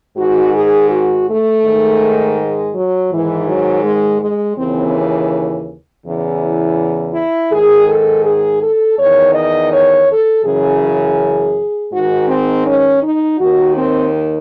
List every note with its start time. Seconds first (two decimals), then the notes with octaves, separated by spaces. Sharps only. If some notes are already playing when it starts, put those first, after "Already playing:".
0.17 G#2 D#3 F#4
0.54 G#4
0.91 F#4
1.28 A3
1.63 G#2 D#3
2.37 G#3
2.74 F#3
3.11 G#2 D#3 E3
3.48 F#3
3.84 G#3
4.21 G#3
4.58 D#2 C#3 E3 C4
6.05 E2 C#3 E3
7.14 E4
7.51 G#2 D#3 G#4
7.88 A4
8.25 G#4
8.62 A4
8.99 E2 D#3 C#5
9.35 D#5
9.71 C#5
10.09 A4
10.45 F#2 C#3 E3 G#4
11.92 G#2 D#3 F#4
12.28 C4
12.66 C#4
13.02 D#4
13.38 D#2 D#3 F#4
13.75 C4